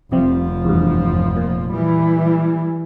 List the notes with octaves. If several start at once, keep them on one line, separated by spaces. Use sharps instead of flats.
F1 F2 C3 F3 G3
E2 G2
A#2
E3 G3